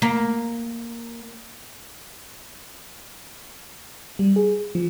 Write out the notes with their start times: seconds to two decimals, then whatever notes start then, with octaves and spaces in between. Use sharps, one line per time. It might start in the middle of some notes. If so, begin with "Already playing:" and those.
0.02 A#3
4.19 G3
4.36 G#4
4.75 F3